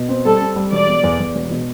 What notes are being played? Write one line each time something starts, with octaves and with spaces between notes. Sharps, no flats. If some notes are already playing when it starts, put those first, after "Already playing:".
Already playing: B2
C4
G3 A4
C4
G3
E1 D5
B2
E2
E2
E1
B2